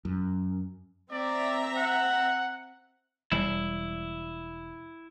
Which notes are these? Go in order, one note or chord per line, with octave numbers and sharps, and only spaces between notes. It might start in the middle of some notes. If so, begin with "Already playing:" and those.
F#2
C4 D5 E5 A#5
F#5
E1 G3 E4